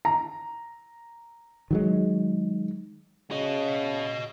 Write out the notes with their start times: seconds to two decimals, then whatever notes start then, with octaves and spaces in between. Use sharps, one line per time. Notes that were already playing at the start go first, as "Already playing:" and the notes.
0.05 A#5
1.71 D#3 F#3 G#3
3.31 C#3 F#4 D#5